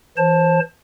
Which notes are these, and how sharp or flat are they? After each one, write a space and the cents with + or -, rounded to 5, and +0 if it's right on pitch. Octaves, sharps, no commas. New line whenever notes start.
E3 +0 C5 +30 A5 +0